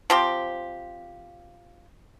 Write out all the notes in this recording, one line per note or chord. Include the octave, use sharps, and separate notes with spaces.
F3 C4 G4